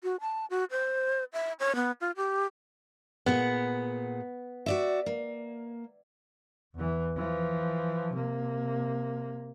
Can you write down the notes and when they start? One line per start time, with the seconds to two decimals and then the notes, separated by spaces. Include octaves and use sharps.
0.03 F#4
0.21 A5
0.50 F#4
0.71 C5
1.33 E5
1.60 C#5
1.75 B3
2.01 F4
2.17 G4
3.26 A#2 B3 G#4 F#5
4.66 F#4 D5 E5
5.06 A#3
6.75 E2 E3
7.16 E3 F3
8.14 C3 A#3